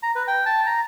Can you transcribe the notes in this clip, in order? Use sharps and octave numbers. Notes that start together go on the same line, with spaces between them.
A#5
B4
G5
A5
A#5